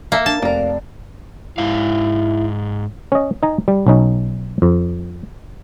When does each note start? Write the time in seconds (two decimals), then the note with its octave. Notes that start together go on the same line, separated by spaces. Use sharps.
0.12 A#3 A4 E5 F5
0.26 D4 A5
0.42 F1 A#3 A#4 D5
1.58 G#2 E4 F5
3.12 C#4 D#5
3.43 D#4 G#5 A#5
3.68 G3
3.87 B1 C#4 D#4
4.62 F2